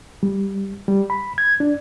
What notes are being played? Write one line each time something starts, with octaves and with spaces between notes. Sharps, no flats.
G3
G3
B5
G#6
D4